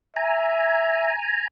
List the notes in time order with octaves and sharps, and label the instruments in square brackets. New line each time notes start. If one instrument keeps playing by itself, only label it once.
[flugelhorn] E5 [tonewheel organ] G#5 A#5